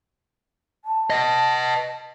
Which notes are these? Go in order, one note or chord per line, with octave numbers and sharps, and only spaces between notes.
A5
B4 D#5